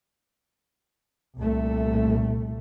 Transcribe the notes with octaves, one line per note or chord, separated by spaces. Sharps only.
C2 A#2 A3